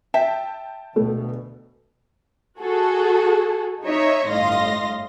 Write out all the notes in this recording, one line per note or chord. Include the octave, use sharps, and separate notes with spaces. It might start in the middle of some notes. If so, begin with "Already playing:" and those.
E5 G5 A5
D2 B2 A3
F#4 G#4 A4
D#4 C#5 E5
G1 A2 D#5 F5 C6 A#6